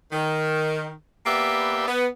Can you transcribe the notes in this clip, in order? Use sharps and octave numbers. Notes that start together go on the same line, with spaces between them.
D#3
A#3 B3 G4 B4 D5 E5
B3